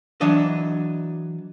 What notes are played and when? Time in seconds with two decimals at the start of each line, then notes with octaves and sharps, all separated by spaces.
0.21 E3 F#3 D4 D#5